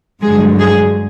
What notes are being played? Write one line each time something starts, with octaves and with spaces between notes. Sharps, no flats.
G2 D3 F#3 G#3 G#4
G#3 G#4